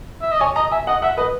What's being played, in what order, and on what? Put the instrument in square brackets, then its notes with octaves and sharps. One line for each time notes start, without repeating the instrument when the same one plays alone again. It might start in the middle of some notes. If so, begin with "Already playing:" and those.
[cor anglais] E5
D#5
[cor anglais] C#5 [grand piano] G#5
[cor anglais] D#5 [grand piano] A#5
[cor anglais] E5 [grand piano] G#5
[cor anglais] D#5 [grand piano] F#5
[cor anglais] E5 [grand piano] F#5
[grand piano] B4 [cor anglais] D#5